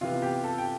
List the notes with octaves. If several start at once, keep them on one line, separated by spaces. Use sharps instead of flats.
C3 E3 B3 F4
G4
A4
G5